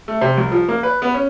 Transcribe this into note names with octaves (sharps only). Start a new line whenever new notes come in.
A3
C3
C2
F3
A#3
B4
B3
C#4